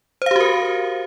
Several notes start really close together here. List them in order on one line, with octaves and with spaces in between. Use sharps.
C5 F5 G4 F#4 A#4